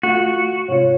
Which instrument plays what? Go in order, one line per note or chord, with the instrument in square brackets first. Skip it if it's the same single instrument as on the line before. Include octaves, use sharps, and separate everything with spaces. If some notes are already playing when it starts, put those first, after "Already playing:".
[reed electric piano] A3 F4 F5 [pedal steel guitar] F#4
[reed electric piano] G#2 C3 F4 [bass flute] C#5